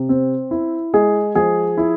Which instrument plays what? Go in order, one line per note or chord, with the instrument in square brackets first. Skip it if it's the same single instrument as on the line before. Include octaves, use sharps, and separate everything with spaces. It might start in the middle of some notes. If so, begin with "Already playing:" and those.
Already playing: [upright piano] C3
C4
E4
G#3 G#4
F3 G#4
E4